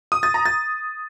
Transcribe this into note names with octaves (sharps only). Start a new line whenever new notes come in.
D#6
A6
A#5
A6